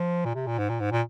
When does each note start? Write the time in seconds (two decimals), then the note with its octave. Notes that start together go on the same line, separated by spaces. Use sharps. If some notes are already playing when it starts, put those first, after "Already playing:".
Already playing: F3
0.25 A#2
0.35 C3
0.46 A#2
0.58 G#2
0.69 A#2
0.80 G#2
0.91 A#2